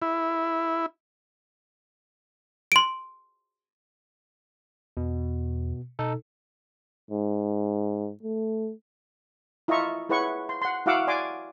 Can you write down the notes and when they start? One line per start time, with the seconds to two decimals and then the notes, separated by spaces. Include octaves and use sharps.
0.02 E4
2.72 C6 D7
4.97 E2 B2
5.99 B2 D#4 A4
7.11 G#2
8.23 A3
9.68 E4 F4 D#5 E5 A#5 C#6
10.09 E4 G#4 B4 C#5 F#5 C#6
10.49 C6
10.62 F#5 C6
10.86 E4 F#4 F5 F#5 D6 E6
11.07 D5 G#5 C6 D6